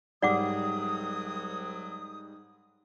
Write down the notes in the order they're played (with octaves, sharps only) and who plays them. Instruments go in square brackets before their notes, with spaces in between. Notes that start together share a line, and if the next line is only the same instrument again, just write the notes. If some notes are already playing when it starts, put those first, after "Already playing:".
[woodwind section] C2 F#3 D#6 [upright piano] G#2 G3 [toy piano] D5 F#5 D6